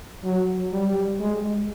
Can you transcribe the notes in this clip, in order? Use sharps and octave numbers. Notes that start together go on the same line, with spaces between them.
F#3
G3
G#3